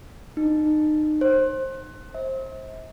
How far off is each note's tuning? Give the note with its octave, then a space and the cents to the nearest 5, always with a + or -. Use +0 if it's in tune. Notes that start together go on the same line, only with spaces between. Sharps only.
D#4 -30
C5 +25
E5 -45